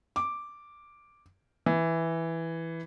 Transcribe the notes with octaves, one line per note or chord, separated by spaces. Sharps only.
D6
E3